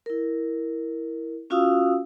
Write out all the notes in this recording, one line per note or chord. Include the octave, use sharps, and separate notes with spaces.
E4 A#4
C#4 F4 F#4 F5 D#6 E6